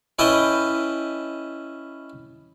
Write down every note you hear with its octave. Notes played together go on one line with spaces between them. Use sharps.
C#4 E4 B4 D#5 G5 A5